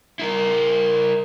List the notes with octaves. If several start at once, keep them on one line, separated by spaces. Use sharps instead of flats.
E4 A#4